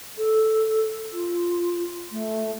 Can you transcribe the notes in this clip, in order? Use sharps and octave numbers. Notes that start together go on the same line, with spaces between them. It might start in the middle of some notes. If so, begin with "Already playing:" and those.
A4
F4
A3